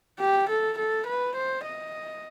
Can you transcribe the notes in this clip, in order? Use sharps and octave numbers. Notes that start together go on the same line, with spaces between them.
G4
A4
A4
B4
C5
D#5